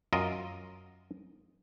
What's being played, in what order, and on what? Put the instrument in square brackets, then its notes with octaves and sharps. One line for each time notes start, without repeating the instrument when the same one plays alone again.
[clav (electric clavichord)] F#2 F4 A#4 D#5